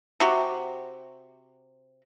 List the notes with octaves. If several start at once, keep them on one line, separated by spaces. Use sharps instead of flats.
C3 F#4 G4